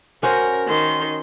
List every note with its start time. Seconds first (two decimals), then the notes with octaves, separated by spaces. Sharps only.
0.23 C#4 F#4 A#4 C5
0.67 D#3 C6